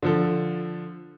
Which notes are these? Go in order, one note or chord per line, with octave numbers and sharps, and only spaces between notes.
D3 F3 A4